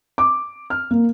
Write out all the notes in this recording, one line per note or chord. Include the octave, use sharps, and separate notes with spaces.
D6
F6
A#3